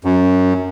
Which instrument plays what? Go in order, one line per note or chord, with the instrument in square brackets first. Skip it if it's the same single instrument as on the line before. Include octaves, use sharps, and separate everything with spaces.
[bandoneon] F#2